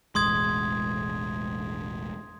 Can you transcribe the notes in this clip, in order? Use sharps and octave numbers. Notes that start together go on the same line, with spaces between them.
E1 A1 G#3 C6 D#6 G#6